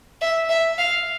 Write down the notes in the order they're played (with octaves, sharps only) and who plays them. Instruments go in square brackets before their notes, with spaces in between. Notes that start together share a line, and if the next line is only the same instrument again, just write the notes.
[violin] E5
E5
F5